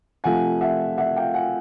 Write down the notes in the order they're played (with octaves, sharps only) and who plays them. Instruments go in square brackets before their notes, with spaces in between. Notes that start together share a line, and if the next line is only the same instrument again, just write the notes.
[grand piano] C3 F3 A3 F#5 G#5
E5 F#5
E5 F#5
F5 G5
F#5 G#5